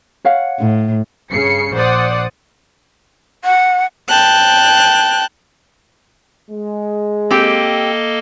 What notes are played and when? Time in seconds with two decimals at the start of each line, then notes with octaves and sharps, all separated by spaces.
0.25 C#5 F5 F#5
0.59 A2
1.31 G2 C#3 C7 C#7
1.75 A#1 C5 D5 F#5 D#6
3.44 F#5
4.09 G5 A5 F#6
6.50 G#3
7.31 A#3 C4 G4 A4 D#5 G5